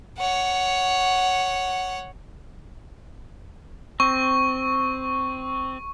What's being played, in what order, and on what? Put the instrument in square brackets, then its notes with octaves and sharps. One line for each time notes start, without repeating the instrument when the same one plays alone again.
[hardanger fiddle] C#5 F#5
[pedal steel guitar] C4 [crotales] C#6